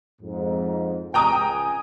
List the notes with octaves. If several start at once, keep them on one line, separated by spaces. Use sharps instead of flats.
F2 G#2
C#2 G5 G#5 A#5 D#6